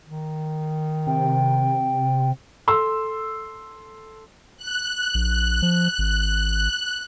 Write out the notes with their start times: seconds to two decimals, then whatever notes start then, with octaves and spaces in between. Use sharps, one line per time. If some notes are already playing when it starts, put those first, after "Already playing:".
0.06 D#3
1.07 C3 G5
2.67 A4 C6 E6
4.57 F#6
5.14 A#1
5.62 F3
5.98 G#1